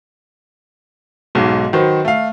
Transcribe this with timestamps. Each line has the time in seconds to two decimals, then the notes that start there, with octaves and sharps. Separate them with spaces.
1.35 B1 G#2 F#4
1.73 D#3 F#3 F#4 B4 C5
2.05 A3 F5